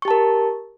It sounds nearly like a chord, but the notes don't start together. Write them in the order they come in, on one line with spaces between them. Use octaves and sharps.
C#6 G4 A5 A#4